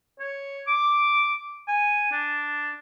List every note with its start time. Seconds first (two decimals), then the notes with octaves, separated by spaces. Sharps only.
0.20 C#5
0.67 D6
1.68 G#5
2.12 D4